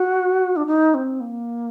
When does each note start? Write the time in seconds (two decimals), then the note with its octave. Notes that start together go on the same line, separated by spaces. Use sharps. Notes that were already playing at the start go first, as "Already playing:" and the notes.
Already playing: F#4
0.56 D4
0.67 D#4
0.95 C4
1.21 A#3